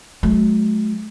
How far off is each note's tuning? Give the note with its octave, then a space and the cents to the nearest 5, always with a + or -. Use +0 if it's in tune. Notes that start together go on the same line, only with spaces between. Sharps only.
F#3 +0 A3 -40